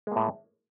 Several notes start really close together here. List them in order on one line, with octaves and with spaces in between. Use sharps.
G#3 A#3 A2